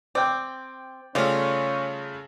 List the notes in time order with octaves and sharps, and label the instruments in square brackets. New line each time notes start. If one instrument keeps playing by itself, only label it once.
[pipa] C4 [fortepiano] D5 G5
[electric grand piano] C#3 A3 [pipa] G3 F4 [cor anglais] C#4